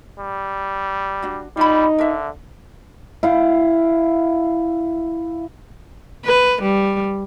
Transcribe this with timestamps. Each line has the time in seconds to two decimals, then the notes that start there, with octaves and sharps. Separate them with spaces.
0.19 G3
1.22 D4 F#4
1.57 G3 D#4 F4 B5
1.98 D3 A#4 E5
3.23 E4 F5 G5
6.25 B4
6.62 G3